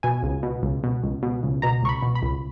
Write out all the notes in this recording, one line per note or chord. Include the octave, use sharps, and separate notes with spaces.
B2 G#5
C#2
B2
C#2
B2
C#2
B2
C#2
B2 A#5
C#2 C#6
B5
B2
B5
C#2